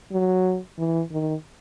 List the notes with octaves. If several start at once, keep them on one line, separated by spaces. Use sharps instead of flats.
F#3
E3
D#3